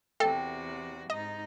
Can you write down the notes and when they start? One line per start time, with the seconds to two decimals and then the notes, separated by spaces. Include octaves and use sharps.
0.20 E2 C3 F#4 A4 G5
1.10 G#2 D#4 D#5